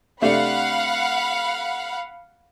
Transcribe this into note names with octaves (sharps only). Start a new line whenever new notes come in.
C3 A3 D4 F5 F#5 B5